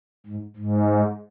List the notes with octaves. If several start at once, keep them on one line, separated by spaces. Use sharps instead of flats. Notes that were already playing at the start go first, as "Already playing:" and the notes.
G#2
G#2